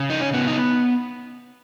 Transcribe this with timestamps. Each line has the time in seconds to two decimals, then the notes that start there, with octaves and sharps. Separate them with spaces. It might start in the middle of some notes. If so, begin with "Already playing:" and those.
Already playing: C#3
0.10 D#4
0.20 C#4
0.34 B3
0.47 D#4